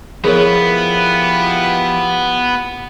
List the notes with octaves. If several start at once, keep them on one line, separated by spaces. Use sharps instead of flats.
F3 B3 E4 F4 G4 G#4 A#4 C#5